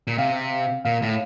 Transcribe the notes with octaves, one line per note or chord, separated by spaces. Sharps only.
A#2
C3 F5
A#2 F5
A2